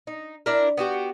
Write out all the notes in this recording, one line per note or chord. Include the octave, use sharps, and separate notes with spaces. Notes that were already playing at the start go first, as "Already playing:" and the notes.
D#4
D4 E4 A#4
B3 F#4 G4